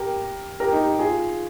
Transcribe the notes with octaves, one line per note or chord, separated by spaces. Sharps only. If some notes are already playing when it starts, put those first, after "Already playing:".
Already playing: G4 A#4
G4 A#4
D#4 G4
F4 G#4